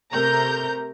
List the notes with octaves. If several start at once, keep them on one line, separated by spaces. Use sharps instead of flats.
C3 A3 A#4 A#5 G6